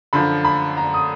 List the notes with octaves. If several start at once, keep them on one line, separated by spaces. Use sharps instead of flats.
F#2 D3 F3 B5
B5
A#5
D#6